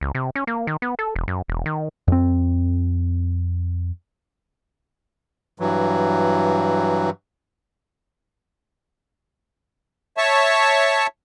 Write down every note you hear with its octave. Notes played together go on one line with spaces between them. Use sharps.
C#2
C3
C#4
A#3
D#3
B3
A4
E1
F#2
E1
D#3
F2 C4
G2 E3 F#3
C#5 E5 A5 C#6